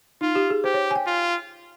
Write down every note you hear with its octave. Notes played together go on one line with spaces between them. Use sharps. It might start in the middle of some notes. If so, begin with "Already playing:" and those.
D#4 F4
G4
G#4
G4 C5
C#5
G#5
G5
F4